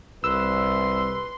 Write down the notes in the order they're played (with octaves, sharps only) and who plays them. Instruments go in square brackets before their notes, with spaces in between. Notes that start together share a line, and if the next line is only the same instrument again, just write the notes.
[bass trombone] C2 [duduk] B4 [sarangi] C6 [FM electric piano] E6